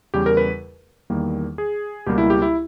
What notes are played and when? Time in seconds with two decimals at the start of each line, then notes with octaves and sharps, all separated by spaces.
0.14 E2 C#3 G3 G4
0.26 A#4
0.37 B4
1.10 E2 D#3 G3 A#3
1.58 G#4
2.06 C#2 B2 G3 A#3 G4
2.18 E4
2.30 G4
2.42 E4